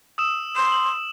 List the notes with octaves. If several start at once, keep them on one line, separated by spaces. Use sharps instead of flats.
D#6 E6 E7
C6 E7
F#7